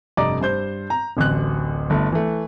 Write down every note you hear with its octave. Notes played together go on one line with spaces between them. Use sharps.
F1 G2 D5 D#5 A#5 D6
G2 C5 G6
A#5
D1 A1 D2 F#6
G1 A3 A4
E3 A3